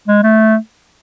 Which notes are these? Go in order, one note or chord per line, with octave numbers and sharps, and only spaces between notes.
G#3
A3